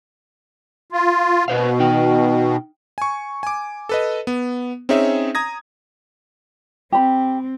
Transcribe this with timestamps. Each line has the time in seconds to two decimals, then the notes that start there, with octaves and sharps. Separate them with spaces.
0.92 F4
1.48 B2 B4 C5 F5
1.80 D#4 G5
2.98 G#5 C#6
3.43 G#5 D6
3.89 A4 B4 D#5
4.27 B3
4.89 C4 C#4 D#4 G#4 C#5 E5
5.35 A#5 D#6 G#6 A#6
6.92 C4 G4 B5